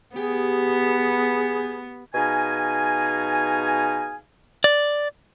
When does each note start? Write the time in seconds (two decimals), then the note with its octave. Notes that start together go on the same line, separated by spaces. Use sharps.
0.16 B3 G4 G#4
2.14 B2 D#4 G#4 F5 G#5
4.64 D5